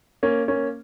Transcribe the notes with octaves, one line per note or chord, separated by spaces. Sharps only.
A#3 C#4
A#3 C#4